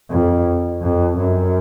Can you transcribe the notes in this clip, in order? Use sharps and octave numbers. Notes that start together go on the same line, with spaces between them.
F2
F2
F#2